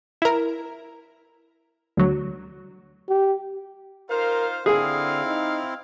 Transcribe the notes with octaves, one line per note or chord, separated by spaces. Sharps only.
E4 A#4
D2 F#3
G4
D#4 F4 A#4 C5 F5
D3 C4 E4 G#4 F5
D#4